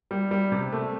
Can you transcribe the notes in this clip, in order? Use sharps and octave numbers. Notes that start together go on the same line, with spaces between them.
G3
G3
C3
A3